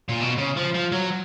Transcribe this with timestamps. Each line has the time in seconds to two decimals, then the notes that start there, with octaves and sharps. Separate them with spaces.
0.09 A#2
0.21 B2
0.38 C#3
0.57 F3
0.75 F3
0.92 F#3